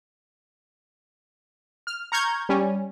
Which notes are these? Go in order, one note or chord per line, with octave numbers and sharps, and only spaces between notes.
F6
A#5 C#6 F6 G6 G#6
G3 C#4